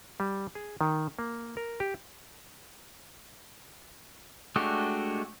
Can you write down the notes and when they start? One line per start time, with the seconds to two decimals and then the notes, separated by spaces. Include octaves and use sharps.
0.20 G3
0.55 G#4
0.81 D#3
1.19 A#3
1.57 A#4
1.80 G4
4.56 G#3 A3 D4 F#4 G4